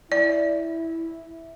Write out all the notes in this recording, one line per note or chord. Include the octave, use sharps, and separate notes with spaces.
E4 D5